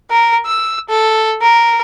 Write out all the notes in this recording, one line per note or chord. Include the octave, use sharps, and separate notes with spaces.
A#4
E6
A4
A#4